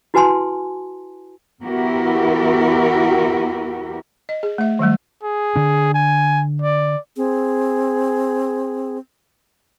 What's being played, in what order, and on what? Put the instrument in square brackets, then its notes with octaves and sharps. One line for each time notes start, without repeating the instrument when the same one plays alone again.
[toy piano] E4 F#4 B4 G#5 A5 C6
[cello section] E2 B3 E4 F#4 G4 A#4
[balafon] D#5
G#4
A3 E5
D#3 F#3 G3 A3
[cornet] G#4
[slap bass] D3 D4
[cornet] G#5
D5
[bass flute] C4 [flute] G#4